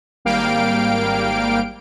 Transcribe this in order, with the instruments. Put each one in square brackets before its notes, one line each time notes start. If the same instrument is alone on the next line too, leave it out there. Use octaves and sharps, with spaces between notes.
[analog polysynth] G#1 G3 A#3 F5 G5 D7